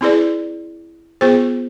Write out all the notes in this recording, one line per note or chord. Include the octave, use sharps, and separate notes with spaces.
C4 E4 G#4 B4 D5
B3 F4 G#4 C5